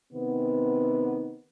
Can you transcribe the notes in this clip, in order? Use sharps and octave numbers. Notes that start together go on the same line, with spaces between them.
C3 D#3 B3